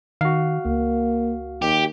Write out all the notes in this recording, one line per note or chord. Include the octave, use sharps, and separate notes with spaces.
D#3 F#4 F5
C#2 A#3
D#2 G4